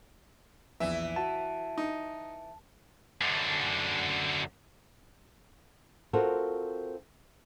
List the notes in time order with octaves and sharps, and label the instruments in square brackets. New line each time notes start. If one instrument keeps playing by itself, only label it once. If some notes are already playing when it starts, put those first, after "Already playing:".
[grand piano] A#1 E2 [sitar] E3 E4 [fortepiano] E5
[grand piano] F#4 [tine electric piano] A5
[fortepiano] D#4
[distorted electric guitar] F#2 D3
[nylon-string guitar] C4 F4 F#4 A4 A#4